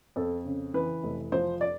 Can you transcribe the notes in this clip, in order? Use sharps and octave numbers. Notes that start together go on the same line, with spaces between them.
F2 A4
C#3
E3 B4
F1
F3 C5
D5